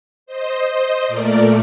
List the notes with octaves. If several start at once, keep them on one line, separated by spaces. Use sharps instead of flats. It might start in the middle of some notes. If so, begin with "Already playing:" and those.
C5 D#5
C5 D#5
A#2 A3 A#4 D5